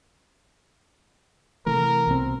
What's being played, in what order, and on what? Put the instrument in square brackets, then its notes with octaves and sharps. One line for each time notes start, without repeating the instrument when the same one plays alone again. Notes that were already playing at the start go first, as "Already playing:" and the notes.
[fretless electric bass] C3 E3 A3 [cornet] A#4
[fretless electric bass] C2 B2 C4